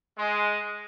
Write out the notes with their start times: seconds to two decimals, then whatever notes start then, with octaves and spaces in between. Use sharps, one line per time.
0.18 G#3